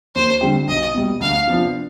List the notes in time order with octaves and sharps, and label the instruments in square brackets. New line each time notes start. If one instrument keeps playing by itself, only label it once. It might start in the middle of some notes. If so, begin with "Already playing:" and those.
[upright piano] D#2 [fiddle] C5
[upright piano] D3 G3 C4 G4
[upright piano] B1 [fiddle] D#5
[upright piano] B2 G3
[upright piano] D2 [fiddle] F5
[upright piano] C3 F3 B3 D4